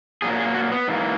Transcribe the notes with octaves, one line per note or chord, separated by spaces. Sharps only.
A#2 F#3 A#3 G#4
G#4
F#4
B3
G#2 E3 A#3